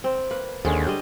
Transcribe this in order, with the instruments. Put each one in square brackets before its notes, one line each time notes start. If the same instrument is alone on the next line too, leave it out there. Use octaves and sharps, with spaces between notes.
[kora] C4
A#3 B4
[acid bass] D#2 [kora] D3 G#3 C#4
[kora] G3 D#5